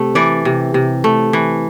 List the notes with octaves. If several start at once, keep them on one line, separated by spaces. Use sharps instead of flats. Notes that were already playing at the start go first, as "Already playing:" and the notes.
Already playing: C3 A3
E3 D5
C3
C3
A3
E3